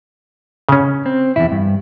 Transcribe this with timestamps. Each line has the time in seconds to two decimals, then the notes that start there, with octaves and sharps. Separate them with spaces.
0.69 C#3 C#4
1.06 C4
1.36 E2 E4
1.52 G2